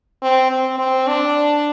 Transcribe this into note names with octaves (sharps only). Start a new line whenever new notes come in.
C4
C4
C4
D4